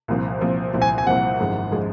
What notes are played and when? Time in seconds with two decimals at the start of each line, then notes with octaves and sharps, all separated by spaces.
0.08 C2 A#2 F3 C4
0.41 C2 A#2 F3 C4
0.74 C2 A#2 F3 C4
0.82 G#5
0.98 G#5
1.06 C2 A#2 F3 C4 F#5
1.40 G#1 F#2 F3 G#3
1.72 F3 G#3